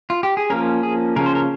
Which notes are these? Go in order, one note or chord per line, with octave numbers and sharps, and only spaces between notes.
F4
G4
G#4
F3 A#3 C#4 A#4
G#4
C#3 F3 A#3 C#4 A#4
C5
A#4